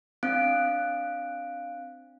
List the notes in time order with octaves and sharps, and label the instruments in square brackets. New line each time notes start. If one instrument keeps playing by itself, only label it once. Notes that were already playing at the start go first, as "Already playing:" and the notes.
[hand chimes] C4 D4 F5 F#6 D7